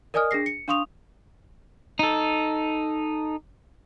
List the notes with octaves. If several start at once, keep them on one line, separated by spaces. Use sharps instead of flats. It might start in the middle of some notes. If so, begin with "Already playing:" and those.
A#4 D5 D#5 G#5 D#6 F6
D4 G#4 A#6 C7
C#7
D4 F5 C6 C#6 D#6 F7
D#4 A4